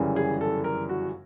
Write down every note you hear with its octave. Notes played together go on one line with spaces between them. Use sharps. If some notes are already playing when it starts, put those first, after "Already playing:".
Already playing: G1 F#2 C#3 E3 G3
G#4
A4
A#4
F#4